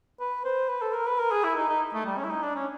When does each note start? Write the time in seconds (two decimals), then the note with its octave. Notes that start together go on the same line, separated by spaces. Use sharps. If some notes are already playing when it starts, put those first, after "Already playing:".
0.20 B4
0.45 C5
0.69 B4
0.81 A4
0.94 A#4
1.07 B4
1.19 A#4
1.32 G#4
1.44 E4
1.56 D#4
1.69 D#4
1.94 A3
2.06 G3
2.18 C#4
2.24 E4
2.30 D#4
2.43 D4
2.55 C#4